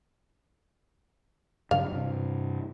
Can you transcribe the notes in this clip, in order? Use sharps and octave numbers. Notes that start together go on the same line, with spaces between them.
G2 C#3 F#3 F5
G2 C3